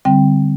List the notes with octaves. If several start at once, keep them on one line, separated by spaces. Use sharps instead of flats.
D3 G3 C4 G5